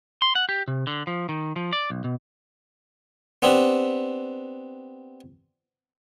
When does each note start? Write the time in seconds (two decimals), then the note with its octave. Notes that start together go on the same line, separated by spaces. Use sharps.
0.22 C6
0.35 F#5
0.49 G4
0.68 C3
0.87 D3
1.07 F3
1.29 D#3
1.56 F3
1.73 D5
1.90 B1
2.04 B2
3.42 B3 C4 D4 G4